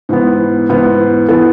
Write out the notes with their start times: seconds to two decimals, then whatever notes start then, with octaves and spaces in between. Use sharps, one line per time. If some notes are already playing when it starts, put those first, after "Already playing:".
0.09 G#2 E3 B3
0.69 G#2 E3 B3
1.28 E3 B3 A4